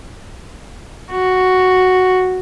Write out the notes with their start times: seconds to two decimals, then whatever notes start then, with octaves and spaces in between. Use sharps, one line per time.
1.11 F#4